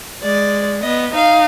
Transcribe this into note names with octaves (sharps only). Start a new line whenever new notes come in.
G#3 D5
B3 D#5
D#4 F5